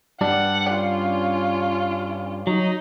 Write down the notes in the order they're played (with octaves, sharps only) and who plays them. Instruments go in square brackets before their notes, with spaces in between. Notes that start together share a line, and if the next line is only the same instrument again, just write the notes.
[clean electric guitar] G2 G3 D4 [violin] F#5
[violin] C#4 F4
[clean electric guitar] F#3 [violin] D#4